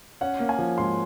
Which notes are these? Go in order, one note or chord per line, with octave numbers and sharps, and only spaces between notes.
C#4 F#5
A#3
G#5
F3
G#2 C6